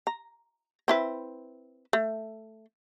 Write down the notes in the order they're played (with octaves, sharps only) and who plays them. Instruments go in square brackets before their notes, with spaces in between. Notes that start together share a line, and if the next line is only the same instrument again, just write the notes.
[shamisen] A#5
C4 E4 B4
A3